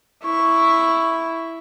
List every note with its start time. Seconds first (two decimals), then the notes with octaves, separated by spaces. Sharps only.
0.23 E4 C#6